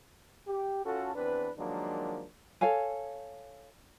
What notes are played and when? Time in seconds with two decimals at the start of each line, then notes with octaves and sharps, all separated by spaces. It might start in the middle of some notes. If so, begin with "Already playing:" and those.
0.48 G4
0.85 C#4 F4 F#4 A4
1.14 E2 C4 D4 B4
1.57 D#3 F3 F#3 G#3 A#3 D4
2.61 A4 C#5 F5 G#5